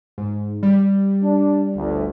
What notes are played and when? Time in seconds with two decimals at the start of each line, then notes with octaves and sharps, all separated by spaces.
0.18 G#2
0.63 G3
1.23 D4
1.76 G1 D2